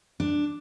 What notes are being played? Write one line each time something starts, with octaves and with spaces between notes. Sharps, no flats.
D4